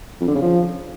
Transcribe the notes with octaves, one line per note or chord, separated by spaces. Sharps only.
F2
D3
C#3
F3